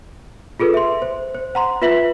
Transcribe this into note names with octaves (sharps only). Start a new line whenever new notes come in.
F4 G#4 A4 B4
E5 C6
C5
C5
F#5 A#5 C6
F4 B4 E5 B6 F#7